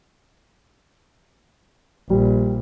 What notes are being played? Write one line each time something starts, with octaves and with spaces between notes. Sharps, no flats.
A#1 G3